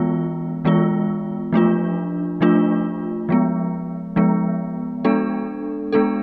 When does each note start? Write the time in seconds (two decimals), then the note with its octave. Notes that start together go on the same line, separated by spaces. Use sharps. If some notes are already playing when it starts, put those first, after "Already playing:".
Already playing: E3 G#3 B3 F4
0.65 E3 G#3 B3 F4
1.52 F3 A3 D4 F4
2.41 F3 A3 D4 F4
3.29 F3 G#3 B3
4.16 F3 G#3 B3
5.05 G#3 B3 D4 A4
5.92 G#3 B3 D4 A4